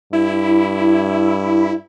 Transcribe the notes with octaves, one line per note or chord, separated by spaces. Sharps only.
G2 E4